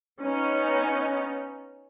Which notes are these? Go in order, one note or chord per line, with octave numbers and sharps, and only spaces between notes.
B3 C#4 D#4